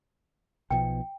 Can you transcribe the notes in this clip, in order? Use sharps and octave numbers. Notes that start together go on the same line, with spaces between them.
B1 B2 F3 G5